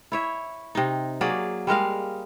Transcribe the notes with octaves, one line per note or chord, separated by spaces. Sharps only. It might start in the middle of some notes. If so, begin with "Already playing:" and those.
E4 C#5 E5
C3 D#4
F#3 A#3 G#4 D5
G3 G#3 A#4 F5